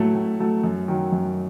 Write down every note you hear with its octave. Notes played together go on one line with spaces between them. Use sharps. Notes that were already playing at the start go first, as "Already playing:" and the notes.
Already playing: A2 F#3 A3
A2
F#3 A3
F#2
D#3 F#3
F#2